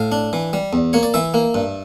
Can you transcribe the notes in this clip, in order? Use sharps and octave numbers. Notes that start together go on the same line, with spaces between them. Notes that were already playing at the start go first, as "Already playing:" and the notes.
Already playing: A2 F5
D4
E3
G3
E2
A#3 C#5
D5
E3 E5
A#3
G2